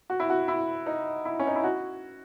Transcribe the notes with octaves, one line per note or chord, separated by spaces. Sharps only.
F#4
E4
F#4
E4
D#4
E4
C#4
D#4
E4
F#4